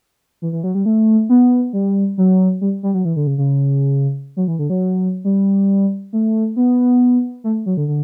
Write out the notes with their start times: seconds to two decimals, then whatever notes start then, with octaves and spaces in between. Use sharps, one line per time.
0.42 E3
0.52 E3
0.64 F#3
0.75 G3
0.86 A3
1.29 B3
1.73 G3
2.18 F#3
2.61 G3
2.83 G3
2.94 F#3
3.05 E3
3.16 D3
3.27 C#3
3.38 C#3
4.37 F#3
4.48 E3
4.59 D3
4.70 F#3
5.24 G3
6.13 A3
6.56 B3
7.44 A3
7.66 F#3
7.77 D3
7.88 D3